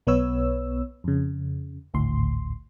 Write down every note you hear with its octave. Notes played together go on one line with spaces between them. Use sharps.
B1 B3 B4 C#5 E6
F2 C#3
G#1 D2 A2 C6